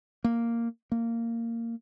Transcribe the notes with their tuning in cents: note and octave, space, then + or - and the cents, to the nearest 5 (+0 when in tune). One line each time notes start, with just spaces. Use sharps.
A#3 -5
A#3 -15